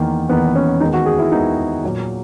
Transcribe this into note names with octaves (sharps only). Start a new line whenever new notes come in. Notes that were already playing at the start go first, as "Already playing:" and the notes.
Already playing: E2 D#3 A#3
E2 D#3 A#3 B3
C#4
D#2 D#3 G#3 B3 D#4
F#4
G#4
E4
D#2 D#3 G#3 B3 D#4
A#2 F#3 A#3